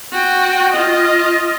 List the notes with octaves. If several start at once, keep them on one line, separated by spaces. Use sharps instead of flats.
F#4 G5
F4 D#5